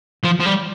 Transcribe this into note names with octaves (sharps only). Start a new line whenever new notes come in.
F3
F3
G3